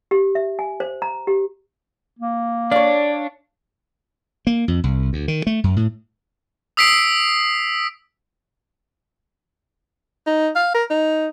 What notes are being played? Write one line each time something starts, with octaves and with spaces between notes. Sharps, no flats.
G4
E5
G#5
C5
A#5
G4
A#3
D4 C#5 D5 F5
A#3
F2
C2
D2
D#3
A3
F#2
A2
D#6 E6 B6 C7 D7
D#4
F5
A#4
D#4